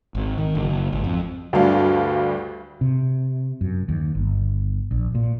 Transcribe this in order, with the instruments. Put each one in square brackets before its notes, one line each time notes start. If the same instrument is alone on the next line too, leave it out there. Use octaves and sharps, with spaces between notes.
[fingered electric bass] G#1
D#3
F#1
G#1
F2
[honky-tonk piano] D2 G2 D4 F5
[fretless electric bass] C3
F#2
D#2
G1
A#1
A#2